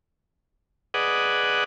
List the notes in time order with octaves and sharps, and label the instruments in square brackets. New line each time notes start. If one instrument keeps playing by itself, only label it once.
[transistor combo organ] G#4 B4 D5 D#5 F#5